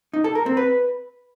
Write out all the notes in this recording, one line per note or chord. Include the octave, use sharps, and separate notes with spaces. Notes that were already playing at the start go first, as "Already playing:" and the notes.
D#4
A4
A#4
C4
B4